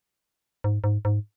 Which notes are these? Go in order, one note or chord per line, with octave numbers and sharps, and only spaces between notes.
G#2
G#2
G#2